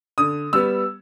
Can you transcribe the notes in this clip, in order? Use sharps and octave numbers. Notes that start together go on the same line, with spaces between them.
D3 D#6
G3 B3 E6